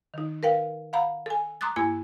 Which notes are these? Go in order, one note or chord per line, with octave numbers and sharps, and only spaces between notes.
D#3 D#4
A#4 B4 F5 G5
F5 F#5 A#5 B5
A4 G#5
A#5 C6 D6 D#6 F#6 A6
G2 A#3 E4 G#5 G#6